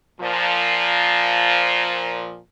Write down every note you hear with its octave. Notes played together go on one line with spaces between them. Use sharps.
A#2 F3